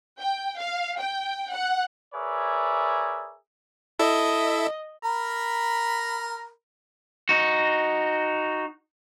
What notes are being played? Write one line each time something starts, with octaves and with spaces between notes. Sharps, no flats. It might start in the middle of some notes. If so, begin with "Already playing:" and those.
G5
F5
G5
F#5
G#4 A#4 B4 C#5 D5 E5
E4 A4 D#5 E5
A#4 A#5 B5
D#4 F#4